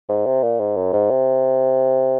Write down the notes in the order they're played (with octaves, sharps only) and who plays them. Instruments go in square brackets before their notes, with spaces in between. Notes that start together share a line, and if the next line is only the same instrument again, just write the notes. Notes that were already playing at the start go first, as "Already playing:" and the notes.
[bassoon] G#2
C3
A#2
G#2
F#2
G#2
C3